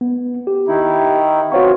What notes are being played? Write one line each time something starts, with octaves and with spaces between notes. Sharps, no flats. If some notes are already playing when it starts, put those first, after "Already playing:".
B3
G4
D#3 D#4 E4
B3 C4 F4 F#4 C#5 C#6